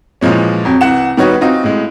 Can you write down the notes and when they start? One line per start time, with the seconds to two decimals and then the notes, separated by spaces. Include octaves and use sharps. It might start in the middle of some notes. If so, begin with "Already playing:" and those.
0.21 A#2 E3 F3 G#3 C#4
0.65 F2 F#3
0.81 C2 E3 F#5 E7
1.17 D#3 G3 B3 D#4 F#4 C#5
1.41 C4 D#4 F4 F#4
1.64 A2 G#3